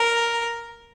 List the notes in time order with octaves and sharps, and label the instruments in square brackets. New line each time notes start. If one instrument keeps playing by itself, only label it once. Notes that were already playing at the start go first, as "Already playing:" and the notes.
Already playing: [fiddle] A#4